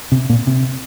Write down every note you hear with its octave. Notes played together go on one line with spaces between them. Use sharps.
C3
A#2
C3